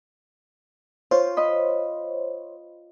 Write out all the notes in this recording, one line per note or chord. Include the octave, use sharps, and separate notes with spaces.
F4 C5 C#5
D#5 B5